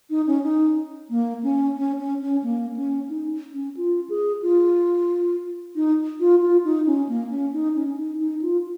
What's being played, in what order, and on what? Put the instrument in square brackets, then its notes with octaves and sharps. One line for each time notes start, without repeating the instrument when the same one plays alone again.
[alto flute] D#4
C#4
D#4
A#3
C#4
C#4
C#4
C#4
A#3
C#4
D#4
C#4
F4
G#4
F4
D#4
F4
F4
D#4
C#4
A#3
C#4
D#4
C#4
D#4
D#4
F4